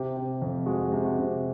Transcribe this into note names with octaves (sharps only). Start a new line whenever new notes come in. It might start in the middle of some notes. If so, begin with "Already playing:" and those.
Already playing: C3 G4
C3
F2
G#3 F#4
C3
F#4
C3